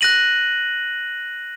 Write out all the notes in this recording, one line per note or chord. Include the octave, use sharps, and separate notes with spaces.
F#6 A#6 D#7 F#7